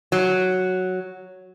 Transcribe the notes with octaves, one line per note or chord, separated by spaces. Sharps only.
F#3